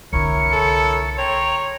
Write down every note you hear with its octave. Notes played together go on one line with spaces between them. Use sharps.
C2 D3 E4 A#4 C#5 C#7
A4
C#5 G5 A#5 C6 F7